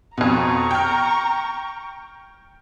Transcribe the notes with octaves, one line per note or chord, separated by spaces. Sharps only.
F2 B2 A#5 C#6
G5 F6